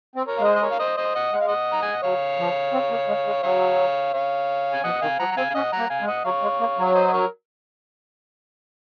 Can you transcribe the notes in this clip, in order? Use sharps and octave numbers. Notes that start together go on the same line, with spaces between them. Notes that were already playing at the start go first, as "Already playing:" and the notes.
C4
A#4 C#5
G#3 F5
C5 D#5
D#5
A#4 C#5
F5
C5 D#5
C5 D#5
D#5 F#5
G#3 F#5
F5
D#5 F#5
A#5
G#5
F#5
F#3 C#5 F5
F3
C4
A#3
G#3
G#3
F#3 C#5 F5
C#5 F5
G#5
F3 D#5 F#5
D#3 F5 G#5
F3 F#5 A#5
A#5
C4 F5 G#5
F5
C#4 D#5 F#5
F#5 A#5
A#3
F5 G#5
G#3
D#5 F#5
F#3 C#5 F5
G#3
A#3
F#3
C#5
C5 D#5
D#5
A#4 C#5